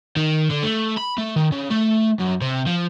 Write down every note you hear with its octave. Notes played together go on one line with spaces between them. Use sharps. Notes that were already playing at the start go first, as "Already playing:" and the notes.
D#3
D3
A3
B5
A3
D#3
C#3
A3
F#2
C3
F3